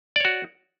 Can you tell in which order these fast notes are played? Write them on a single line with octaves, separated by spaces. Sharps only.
D5 C#5 F#4